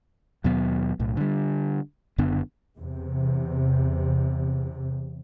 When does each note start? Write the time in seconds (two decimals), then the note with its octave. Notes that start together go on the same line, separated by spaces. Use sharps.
0.44 D#2 B2 F#3 B3
1.00 B1 A2
1.17 D3 G3
2.18 F#1 F#2 D3 B3
2.77 E2 C3